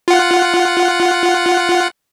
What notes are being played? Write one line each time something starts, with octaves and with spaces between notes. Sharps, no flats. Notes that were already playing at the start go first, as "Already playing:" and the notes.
F4 F#5